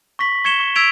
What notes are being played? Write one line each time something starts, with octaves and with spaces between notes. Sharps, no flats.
C#6 A#6 B6 F#7
C#6 G#6 C#7 E7 G7
C#6
E6 G#6 B6 D7 F7